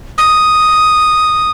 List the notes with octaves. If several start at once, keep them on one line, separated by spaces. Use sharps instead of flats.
D#6